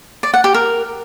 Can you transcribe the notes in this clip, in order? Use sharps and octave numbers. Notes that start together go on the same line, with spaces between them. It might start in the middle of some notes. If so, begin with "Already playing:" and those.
D5
F#5
G4
A#4